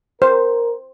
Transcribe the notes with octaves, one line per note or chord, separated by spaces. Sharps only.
A#4 C5